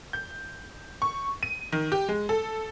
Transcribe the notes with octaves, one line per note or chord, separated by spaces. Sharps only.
G6
C#6
D#7
D#3
G4
G#3
A4